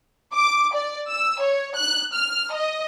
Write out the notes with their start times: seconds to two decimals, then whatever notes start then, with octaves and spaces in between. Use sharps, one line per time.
0.34 D6
0.74 D5
1.09 E6
1.41 C#5
1.77 F#6
2.14 F6
2.53 D#5